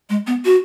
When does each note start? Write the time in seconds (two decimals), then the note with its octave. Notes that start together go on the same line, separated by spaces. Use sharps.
0.10 G#3
0.27 B3
0.45 F#4